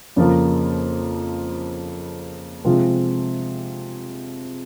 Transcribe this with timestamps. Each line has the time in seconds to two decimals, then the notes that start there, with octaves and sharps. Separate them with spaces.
0.16 F2 C#3 F3 A#3 F4
2.65 C3 F3 G#3 C4 F4